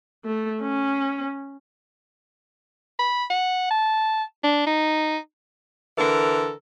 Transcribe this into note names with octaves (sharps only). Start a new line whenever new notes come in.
A3
C#4
B5
F#5
A5
D4
D#4
D3 E3 A4 A#4